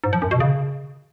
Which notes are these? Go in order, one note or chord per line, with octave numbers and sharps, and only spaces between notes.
G#2
F3
F#2
B2
C#3